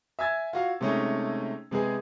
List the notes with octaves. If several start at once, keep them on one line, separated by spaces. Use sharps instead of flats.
E5 G#5 E6 G#6 A6
F4 F#4 F5
C3 G#3 A3 C#4 D#4
C3 G#3 B3 G#4